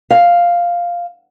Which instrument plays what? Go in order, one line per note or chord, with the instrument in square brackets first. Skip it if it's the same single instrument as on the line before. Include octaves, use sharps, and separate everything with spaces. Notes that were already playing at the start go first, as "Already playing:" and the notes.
[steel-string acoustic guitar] F5